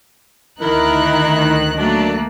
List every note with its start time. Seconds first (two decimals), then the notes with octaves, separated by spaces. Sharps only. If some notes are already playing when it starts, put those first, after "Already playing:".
0.61 D2 D#3 D#4 E4 A#4 F#6
1.77 F#3 A3 A#3 D4